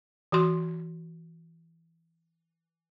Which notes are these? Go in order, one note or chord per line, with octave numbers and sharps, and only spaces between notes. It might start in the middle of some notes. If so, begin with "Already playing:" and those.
E3 F#4 C6